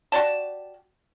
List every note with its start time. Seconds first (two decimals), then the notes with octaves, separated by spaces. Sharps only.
0.12 F#4 G4 D5 A5